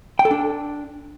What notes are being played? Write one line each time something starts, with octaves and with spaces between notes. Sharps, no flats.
G5
A4
D4